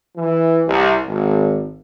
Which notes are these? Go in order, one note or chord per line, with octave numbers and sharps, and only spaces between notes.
E3
C2
G#1